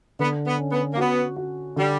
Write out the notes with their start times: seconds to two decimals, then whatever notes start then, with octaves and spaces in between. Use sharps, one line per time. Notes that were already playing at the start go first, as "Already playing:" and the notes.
0.19 D3 B3
0.45 B3
0.58 C#4
0.72 B3
0.93 A#3
0.97 B3 F#4
1.36 F#4
1.76 D3 G3